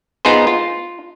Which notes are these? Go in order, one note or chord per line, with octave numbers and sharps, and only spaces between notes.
B3 D#4 F4 G#4 C5
F4